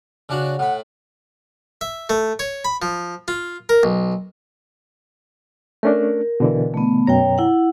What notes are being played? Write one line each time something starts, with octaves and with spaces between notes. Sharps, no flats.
C#3 D4 F#4
A2 F#5 B5
E5
A3
C#5
B5
F3
F4
A#4
B1
A3 C#4 D4 A#4
B2 D3 E3
A3 B3
F#2 B2 C#5 G5 A#5
E4 F#5